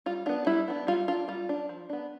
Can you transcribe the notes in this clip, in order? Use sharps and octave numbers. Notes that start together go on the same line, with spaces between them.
G3 F4
B3 D4 F4
G3 E4
B3 D4
G3 F4
D4 F4
G3 F4
D4
F3
B3 D4